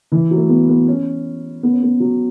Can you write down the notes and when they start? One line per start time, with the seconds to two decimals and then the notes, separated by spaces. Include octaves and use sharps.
0.12 E3
0.31 F#3
0.37 A3
0.49 B3
0.69 B3
0.87 C#4
1.63 B3
1.72 C#4
1.83 B3
2.00 F#3